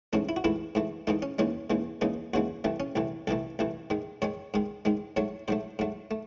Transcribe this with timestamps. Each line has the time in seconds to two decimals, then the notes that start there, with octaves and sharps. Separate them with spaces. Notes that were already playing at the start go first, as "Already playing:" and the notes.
0.13 G#2 E3 A3 C#4
0.29 E4
0.36 F#4
0.44 G#2 E3 A3 E4
0.75 G#2 E3 A3
1.07 G#2 E3 A3 D#4
1.22 C#4
1.38 D#2 C#3 E3 G#3 C#4
1.70 D#2 C#3 E3 G#3
2.01 D#2 C#3 E3 G#3 D#4
2.34 D#2 C#3 E3 G#3 F#4
2.64 C2 C3 E3 A3
2.80 C#4
2.95 C2 C3 E3 A3
3.27 C2 C3 E3 A3 A4
3.59 C2 C3 E3 A3
3.90 G#2 D#3 G#3
4.22 G#2 D#3 G#3 C#5
4.54 G#2 D#3 G#3
4.85 G#2 D#3 G#3
5.16 G#2 F#3 A3 C#5
5.48 G#2 F#3 A3 C5
5.79 G#2 F#3 A3
6.11 A3